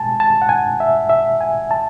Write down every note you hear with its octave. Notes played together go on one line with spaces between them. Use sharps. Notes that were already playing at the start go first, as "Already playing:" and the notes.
Already playing: B2 G#3 G#5 A5
A5
F#5
G#5
E5
E5
G#5
A5